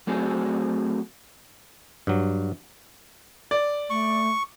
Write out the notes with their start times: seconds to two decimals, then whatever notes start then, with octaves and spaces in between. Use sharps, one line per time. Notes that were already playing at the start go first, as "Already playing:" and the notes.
0.07 F#3 A3 C4 F#4 G#4
2.07 G2 F#3
3.51 D5
3.90 A3 C#6